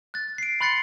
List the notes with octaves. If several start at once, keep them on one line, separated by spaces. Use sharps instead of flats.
F#6 A6
C7 D7
B5 C6 F#6 A6 C7 C#7